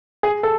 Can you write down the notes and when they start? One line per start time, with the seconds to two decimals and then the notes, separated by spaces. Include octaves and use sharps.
0.23 G#4
0.43 A4